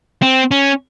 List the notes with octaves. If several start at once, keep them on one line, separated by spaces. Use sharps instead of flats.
C4
C#4